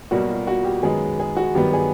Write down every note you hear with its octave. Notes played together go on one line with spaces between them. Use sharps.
B1 B2 G3 A#3 F#4
F4
F#4
G4
F#2 D#3 G#3 B3 G#4
G#4
F#4
G2 D#3 F#3 B3 G4
G#4